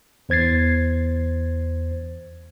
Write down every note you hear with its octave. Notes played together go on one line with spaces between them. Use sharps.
E2 C5 G#6 A6 C7